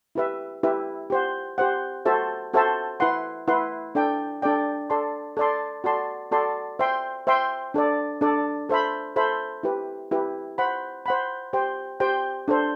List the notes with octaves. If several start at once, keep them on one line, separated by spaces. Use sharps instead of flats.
E4 G4 B4 E5
E4 G4 B4 E5
G4 C5 F#5
G4 C5 F#5
F#4 A4 C5 E5 A5
F#4 A4 C5 E5 A5
E4 B4 F#5 C6
E4 B4 F#5 C6
D4 A4 D5 G5
D4 A4 D5 G5
A4 D5 A5 C6
A4 D5 A5 C6
F#4 A4 D5 A5 C6
F#4 A4 D5 A5 C6
C5 E5 G5 C6
C5 E5 G5 C6
D4 A4 D5
D4 A4 D5
A4 C5 E5 B5
A4 C5 E5 B5
E4 G4 B4
E4 G4 B4
C5 F#5 B5
C5 F#5 B5
G4 C5 G5
G4 C5 G5
D4 A4 C5